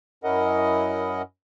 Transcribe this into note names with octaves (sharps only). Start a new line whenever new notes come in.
F#2 C#4 E4 A#4 D#5 F#5